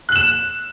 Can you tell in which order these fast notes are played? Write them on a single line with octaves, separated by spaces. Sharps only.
F#6 F#7 E7